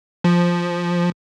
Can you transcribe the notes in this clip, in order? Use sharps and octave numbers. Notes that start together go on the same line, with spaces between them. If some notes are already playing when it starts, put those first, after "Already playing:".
F3